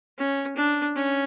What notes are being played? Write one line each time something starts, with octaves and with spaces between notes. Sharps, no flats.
C#4
D4
C#4